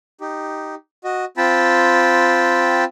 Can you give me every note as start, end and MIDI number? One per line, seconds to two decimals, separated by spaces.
0.21 0.75 63
0.21 0.75 67
1.04 1.25 66
1.04 1.25 75
1.37 2.84 60
1.37 2.84 65
1.37 2.84 79
1.37 2.84 81
1.37 2.84 83